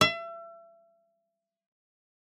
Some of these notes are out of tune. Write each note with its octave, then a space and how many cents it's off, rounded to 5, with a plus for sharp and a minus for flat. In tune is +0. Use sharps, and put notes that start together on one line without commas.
E5 +35